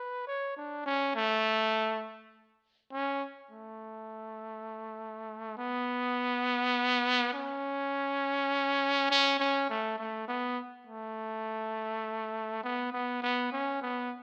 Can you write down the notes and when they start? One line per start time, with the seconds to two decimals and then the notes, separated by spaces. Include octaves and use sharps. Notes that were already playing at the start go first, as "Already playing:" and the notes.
Already playing: B4
0.27 C#5
0.57 D4
0.86 C#4
1.15 A3
2.92 C#4
3.51 A3
5.57 B3
7.34 C#4
9.10 C#4
9.39 C#4
9.69 A3
9.99 A3
10.28 B3
10.87 A3
12.64 B3
12.93 B3
13.22 B3
13.52 C#4
13.81 B3